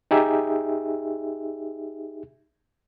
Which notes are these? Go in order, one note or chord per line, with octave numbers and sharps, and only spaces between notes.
D#4 G4 G#4 E5